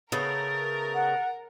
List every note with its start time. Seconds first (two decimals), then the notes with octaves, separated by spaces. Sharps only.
0.12 C#3 A3 B3 A#4 A6
0.94 F#5